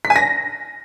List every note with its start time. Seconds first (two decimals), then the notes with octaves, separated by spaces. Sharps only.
0.05 B6
0.10 G#5
0.16 A#6